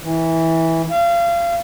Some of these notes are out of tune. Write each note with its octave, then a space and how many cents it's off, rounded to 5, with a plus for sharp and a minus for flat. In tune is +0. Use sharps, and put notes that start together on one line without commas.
E3 -15
F5 -30